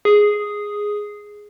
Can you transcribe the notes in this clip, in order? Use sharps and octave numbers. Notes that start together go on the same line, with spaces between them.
G#4